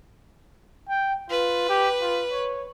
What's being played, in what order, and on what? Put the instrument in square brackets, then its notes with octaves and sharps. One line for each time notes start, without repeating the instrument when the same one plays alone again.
[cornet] G5
[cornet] F4 [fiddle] B4
[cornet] G4
F4
C#5